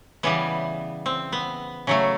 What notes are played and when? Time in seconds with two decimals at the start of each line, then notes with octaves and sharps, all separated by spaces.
0.23 C#3 E3 G3 B3
1.06 C4
1.32 B3
1.87 C#3 F#3 A3